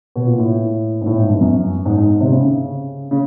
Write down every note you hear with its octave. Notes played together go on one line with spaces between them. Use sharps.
B2
A#2
A2
G#2
A2
G#2
G2
F#2
G#2
G#2
C3
C#3
C#3
C#3